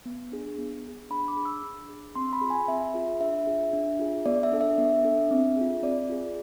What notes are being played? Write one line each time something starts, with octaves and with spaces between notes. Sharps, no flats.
B3
D4 G#4
B3
D4 G#4
D4 B5
D6
G#4
E6
D4
G#4
C4 C6
B5
F4 G#4
G#5
C4 E5
F4 G#4
D4 E5
F4 G#4
D4
F4 G#4
B3 D5
E5
D4 A4
E5
B3
D4 A4
C4
F4 G#4
C4 D5
F4 G#4